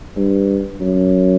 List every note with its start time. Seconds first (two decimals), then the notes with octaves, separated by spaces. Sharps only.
0.16 G2
0.80 F#2